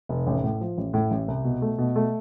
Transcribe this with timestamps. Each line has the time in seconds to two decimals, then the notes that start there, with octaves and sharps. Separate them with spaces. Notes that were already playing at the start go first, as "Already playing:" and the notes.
0.09 F1
0.27 A1
0.44 A2
0.61 F3
0.78 A1
0.94 A2
1.11 A1
1.28 C2
1.44 B2
1.62 A3
1.78 B2
1.96 A3